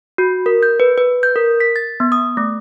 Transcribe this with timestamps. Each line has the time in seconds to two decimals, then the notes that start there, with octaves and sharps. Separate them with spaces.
0.18 F#4
0.46 A#4
0.63 G6
0.80 B4
0.98 B4
1.23 G6
1.36 A#4
1.60 B6
1.76 A6
2.00 B3
2.12 D#6
2.37 A3